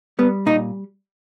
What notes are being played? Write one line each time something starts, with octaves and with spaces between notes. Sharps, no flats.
G3 B3
A#2 D#4